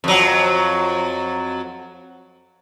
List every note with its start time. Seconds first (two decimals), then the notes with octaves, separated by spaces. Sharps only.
0.04 F2 F#3